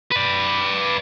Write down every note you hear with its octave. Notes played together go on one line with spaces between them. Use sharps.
B4 D5